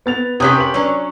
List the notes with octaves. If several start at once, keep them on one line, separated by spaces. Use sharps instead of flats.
B3 A6 F7
C3 C#4 G4 D#6 F#6 B6
B4 F#7
F#3 C#4 D4